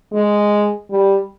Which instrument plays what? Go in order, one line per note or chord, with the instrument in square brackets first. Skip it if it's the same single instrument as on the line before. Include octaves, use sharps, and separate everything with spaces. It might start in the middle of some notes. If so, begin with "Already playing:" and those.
[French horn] G#3
G3